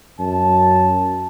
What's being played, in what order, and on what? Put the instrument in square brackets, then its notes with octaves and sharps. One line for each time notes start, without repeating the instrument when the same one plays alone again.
[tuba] F#2 [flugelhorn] A5